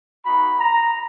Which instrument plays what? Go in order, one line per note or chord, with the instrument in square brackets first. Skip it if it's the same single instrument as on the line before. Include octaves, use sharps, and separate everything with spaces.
[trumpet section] A#3 D#4 F#4 B5
A#5